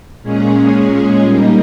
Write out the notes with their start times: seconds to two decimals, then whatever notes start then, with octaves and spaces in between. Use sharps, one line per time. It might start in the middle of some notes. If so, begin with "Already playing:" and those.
0.23 A#2 G#3 C#4 G#4
1.21 G3 A#3 D#4